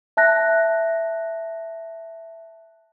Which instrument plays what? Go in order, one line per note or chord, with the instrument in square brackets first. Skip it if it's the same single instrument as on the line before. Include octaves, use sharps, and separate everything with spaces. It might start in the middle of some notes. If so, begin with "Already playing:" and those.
[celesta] E5 A5 F#6 A#6